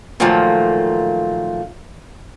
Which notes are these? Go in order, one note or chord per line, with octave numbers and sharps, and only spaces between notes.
A#2 D#3 F3 F#3 A3 A#3